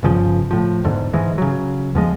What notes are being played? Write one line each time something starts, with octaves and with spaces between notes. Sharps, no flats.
G1 G2 C#3 F3
A2 F3
E2 G#2 D3
G#2 E3 G#3
C#3 F#3
E2 F3 G#3